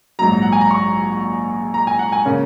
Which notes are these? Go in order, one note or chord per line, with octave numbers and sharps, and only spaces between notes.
A#1 G#2 F#3 A#5
F#5
G#5
A#5
C#6
A#5
G#5
F#5
G#5
C#3 A#3 C#4